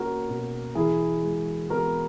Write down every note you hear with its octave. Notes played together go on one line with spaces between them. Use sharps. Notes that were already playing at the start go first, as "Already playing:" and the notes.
Already playing: B2 A#3 C#4 F#4 A#4
B2
E3 E4 G#4
G#3
B3 F#4 A#4